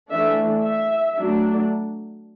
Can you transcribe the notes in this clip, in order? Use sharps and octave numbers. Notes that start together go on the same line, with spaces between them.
E3 A3 D4 E5
E5
F#3 A3 D4